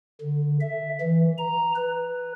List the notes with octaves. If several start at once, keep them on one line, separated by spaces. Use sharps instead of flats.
D3
E5
E3
A#5
B4